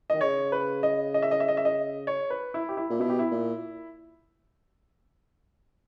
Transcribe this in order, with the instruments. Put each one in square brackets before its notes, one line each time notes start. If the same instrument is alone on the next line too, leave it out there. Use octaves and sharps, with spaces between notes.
[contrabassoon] D#3 [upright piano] D#5
[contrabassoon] C#3 [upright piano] C#5
[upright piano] B4
D#5
D#5
E5
D#5
E5
D#5
E5
D#5
C#5
B4
E4
G4
E4
[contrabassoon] A#2
[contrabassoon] B2 [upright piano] E4
[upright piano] G4
E4
[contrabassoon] A#2